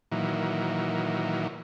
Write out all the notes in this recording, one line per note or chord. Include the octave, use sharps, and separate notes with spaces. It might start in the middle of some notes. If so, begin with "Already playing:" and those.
A#2 D#3 E3 F#3